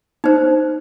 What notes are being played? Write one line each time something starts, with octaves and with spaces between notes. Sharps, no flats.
D#4 C5